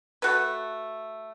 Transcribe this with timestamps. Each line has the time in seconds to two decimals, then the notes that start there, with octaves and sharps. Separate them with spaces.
0.22 A3 F#4 A4 B4